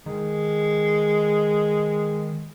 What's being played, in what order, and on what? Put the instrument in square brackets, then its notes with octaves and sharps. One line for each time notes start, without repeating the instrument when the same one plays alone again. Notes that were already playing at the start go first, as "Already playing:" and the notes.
[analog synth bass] D#3 [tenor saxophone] G#3